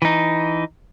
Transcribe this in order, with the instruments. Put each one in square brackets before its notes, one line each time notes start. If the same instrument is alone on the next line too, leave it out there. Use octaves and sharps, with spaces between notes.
[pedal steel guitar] E3 D#4